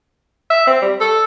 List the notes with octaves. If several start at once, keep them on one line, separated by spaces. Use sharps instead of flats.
E5
C4
G3
A4